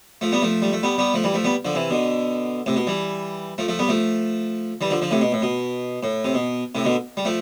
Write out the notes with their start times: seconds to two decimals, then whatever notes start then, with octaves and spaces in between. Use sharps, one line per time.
0.21 F3 A3
0.32 G3 B3
0.42 F3 A3
0.62 G3
0.73 A3
0.83 G3 B3
0.98 G3 B3
1.14 F3 A3
1.24 E3 G3
1.34 F3 A3
1.45 G3 B3
1.65 D3 F3
1.75 C3 E3
1.90 B2 D3
2.66 A2 C3
2.76 B2
2.87 E3 G3
3.58 F3 A3
3.68 F3 A3
3.79 G3 B3
3.89 F3 A3
4.81 E3 G3
4.91 D3 F3
5.01 D3 F3
5.11 A2 C3
5.21 B2
5.32 A2
5.42 B2
6.03 A2
6.25 C3
6.34 B2
6.75 A2 C3
6.85 B2 D3
7.17 G3
7.25 F3 A3